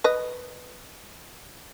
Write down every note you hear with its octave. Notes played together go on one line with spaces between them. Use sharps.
B4 D#5